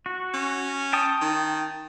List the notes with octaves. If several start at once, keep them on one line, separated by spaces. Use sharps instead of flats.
F#4
C#4
G5 A5 D#6
D#3